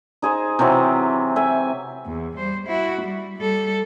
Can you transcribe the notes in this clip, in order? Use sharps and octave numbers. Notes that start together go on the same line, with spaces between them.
D#4 G#4 C5
C3 E3 F#3 C4
E5 G#5
E2
G3 C5
E4 F#4
G3
G3 A4